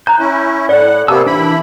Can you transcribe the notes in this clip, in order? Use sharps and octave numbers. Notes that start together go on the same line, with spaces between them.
A#5 F#6 G6
C#4 E4
A2 D5 F#5
C3 A#3 B3 A5 E6
E3 D4 E4 B5